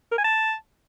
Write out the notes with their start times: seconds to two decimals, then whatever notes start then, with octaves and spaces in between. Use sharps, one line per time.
0.12 A#4
0.18 G#5
0.24 A5